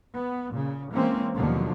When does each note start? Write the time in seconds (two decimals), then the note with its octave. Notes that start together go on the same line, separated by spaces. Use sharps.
0.16 B3
0.51 A#2 C#3
0.93 E3 G#3 A#3 C4 C#4
1.35 D#2 B2 D3 F3 F#3